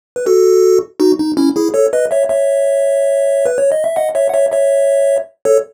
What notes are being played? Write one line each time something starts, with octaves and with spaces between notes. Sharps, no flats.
B4
F#4 A4
D#4 F#4
D#4
C#4 E4
E4 G#4
A4 C#5
B4 D#5
C#5 E5
C#5 E5
B4
C#5
D#5
E5
D#5 F#5
C#5 E5
F#5
C#5 E5
C#5 E5
A4 C#5